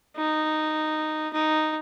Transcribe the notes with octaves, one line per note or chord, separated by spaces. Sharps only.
D#4
D#4